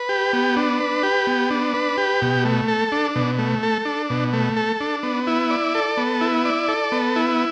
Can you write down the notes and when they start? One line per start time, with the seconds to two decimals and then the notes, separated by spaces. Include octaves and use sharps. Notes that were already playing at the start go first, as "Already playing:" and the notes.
Already playing: B4
0.09 G4
0.33 B3
0.57 D4
0.80 B4
1.03 G4
1.27 B3
1.50 D4
1.74 B4
1.98 G4
2.22 B2
2.45 A3
2.68 A4
2.92 D4
3.16 B2
3.39 A3
3.63 A4
3.85 D4
4.10 B2
4.33 A3
4.57 A4
4.81 D4
5.03 B3
5.27 E4
5.50 D5
5.75 A4
5.97 B3
6.21 E4
6.45 D5
6.68 A4
6.92 B3
7.16 E4